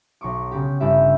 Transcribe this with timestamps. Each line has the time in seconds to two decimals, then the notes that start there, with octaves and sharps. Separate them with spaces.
0.21 B1 C#6 D6
0.52 C#3 G4
0.80 G1 E4 G4 E5